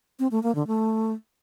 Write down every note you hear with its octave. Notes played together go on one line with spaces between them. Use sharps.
C4
A3
A#3
D3
A3